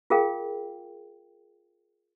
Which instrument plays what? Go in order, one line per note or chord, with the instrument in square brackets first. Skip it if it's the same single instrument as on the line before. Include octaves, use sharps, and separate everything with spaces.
[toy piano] F4 G#4 A#4 F5 G5